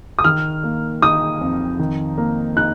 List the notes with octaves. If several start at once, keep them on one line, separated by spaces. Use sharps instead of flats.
D#6
D#3 F6
A#3
D#4 D#6
F2
D#3
A#3
D#4 F#6